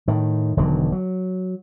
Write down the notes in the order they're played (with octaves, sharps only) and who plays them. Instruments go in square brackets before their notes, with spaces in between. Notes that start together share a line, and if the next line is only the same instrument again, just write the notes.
[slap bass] A2 D#3
E1 D3 D#3 F#3
F#3